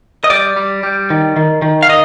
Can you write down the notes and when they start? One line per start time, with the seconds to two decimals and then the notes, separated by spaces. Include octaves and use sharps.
0.24 D#5
0.30 G3 D5
0.56 G3
0.83 G3
1.10 D#3
1.37 D#3
1.62 D#3
1.83 F5
1.89 D#3 D#5